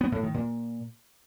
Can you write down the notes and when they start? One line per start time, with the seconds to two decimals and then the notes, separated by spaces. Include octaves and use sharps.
0.01 B3
0.12 A2
0.23 D#3
0.34 A#2